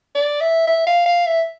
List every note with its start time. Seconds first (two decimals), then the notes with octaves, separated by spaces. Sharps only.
0.15 D5
0.41 E5
0.67 E5
0.87 F5
1.06 F5
1.26 E5